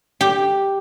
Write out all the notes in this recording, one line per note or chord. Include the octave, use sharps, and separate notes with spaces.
G4